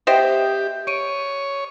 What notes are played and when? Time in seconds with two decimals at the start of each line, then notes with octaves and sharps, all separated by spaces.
0.07 B3 G4 C5 D#5 E5 G5
0.87 C#5 D7 D#7